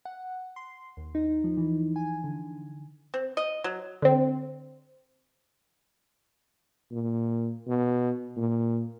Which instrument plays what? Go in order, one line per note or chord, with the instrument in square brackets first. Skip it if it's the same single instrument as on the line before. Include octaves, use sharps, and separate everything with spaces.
[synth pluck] F#5
C6
D#2
D#4
F3
E3
G#5
D3
[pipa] C4
D#5
F#3
[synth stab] D3 C4
[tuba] A#2
B2
A#2